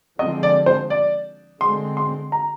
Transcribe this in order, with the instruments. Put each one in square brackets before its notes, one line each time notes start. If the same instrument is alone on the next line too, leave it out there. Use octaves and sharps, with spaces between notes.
[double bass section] D3 F3 G#3 C4 [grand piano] D#5
[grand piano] D5
C5
D5
[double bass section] D3 G#3 C4 [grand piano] C6
[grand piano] C6
A#5